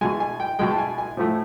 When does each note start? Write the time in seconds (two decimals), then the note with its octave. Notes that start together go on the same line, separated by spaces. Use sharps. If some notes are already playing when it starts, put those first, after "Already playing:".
0.01 B2 G#3 G#5
0.20 G#5
0.40 G5
0.59 B2 G#3 G5
0.71 A5
0.78 G#5
0.98 G#5
1.17 A2 F3 A3